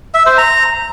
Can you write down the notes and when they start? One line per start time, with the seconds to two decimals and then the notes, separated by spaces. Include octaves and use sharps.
0.14 E5
0.26 C5
0.38 A#5